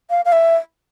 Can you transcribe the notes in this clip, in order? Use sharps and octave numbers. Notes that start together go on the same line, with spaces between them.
F5
F5
E5